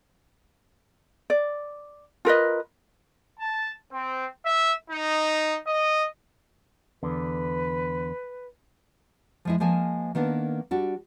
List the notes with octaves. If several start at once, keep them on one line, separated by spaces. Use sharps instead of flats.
D5
F4 A#4 B4 D#5
A5
C4
E5
D#4
D#5
E2 D3 B4
F3 G#3 E4
F3 G#3 A#3 G#5 A5
D#3 A#3 B3 D4
G3 D4 F#4